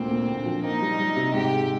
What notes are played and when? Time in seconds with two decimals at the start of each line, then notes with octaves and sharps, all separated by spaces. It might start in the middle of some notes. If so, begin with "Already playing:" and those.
Already playing: D2 A#2 C4
0.11 A#2
0.28 D3
0.45 F3
0.64 A#3 D#4
0.81 G3
1.00 G3
1.16 C3
1.34 G#2 G4
1.51 G#3